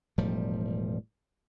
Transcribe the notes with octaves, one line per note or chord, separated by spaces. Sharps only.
E1 A2 F3 G3